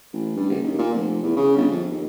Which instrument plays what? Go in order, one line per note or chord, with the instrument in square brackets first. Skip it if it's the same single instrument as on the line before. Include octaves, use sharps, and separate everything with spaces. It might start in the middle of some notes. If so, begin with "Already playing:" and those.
[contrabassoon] A1
G2
F#1
D#2
A#2
F1
E2
C#3
G1
F2
D#2